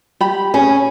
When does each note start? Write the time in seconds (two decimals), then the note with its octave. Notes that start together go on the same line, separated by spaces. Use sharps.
0.21 G4 B5
0.54 C#4 G#4